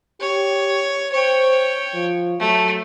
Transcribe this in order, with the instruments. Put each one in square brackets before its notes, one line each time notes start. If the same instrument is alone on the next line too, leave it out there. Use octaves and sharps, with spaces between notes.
[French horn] G4 [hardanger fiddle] C#5
[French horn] C5 [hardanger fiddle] C#5 G5
[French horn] F3
[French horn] F#3 [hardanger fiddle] A3